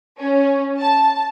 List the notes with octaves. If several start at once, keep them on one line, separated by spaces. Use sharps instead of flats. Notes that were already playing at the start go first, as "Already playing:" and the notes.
C#4
A5